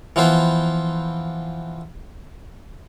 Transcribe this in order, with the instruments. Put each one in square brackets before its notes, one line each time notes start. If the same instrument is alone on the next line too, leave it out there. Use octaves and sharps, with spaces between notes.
[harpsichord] E3 F3 B3 C5